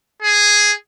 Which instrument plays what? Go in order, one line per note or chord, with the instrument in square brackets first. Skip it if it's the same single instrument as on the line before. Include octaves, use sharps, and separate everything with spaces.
[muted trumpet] G#4